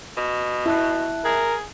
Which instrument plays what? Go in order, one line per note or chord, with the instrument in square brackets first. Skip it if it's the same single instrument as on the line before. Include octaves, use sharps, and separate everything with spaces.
[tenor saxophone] B2
[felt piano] E4 [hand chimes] E5 A5 F#6
[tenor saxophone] G#4 [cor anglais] A#4